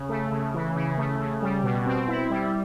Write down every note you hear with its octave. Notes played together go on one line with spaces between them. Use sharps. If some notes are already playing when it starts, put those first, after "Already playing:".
Already playing: C#3
A3
C#3
E3
C#3
A3
C#3
G3
B2
C4
E4
G3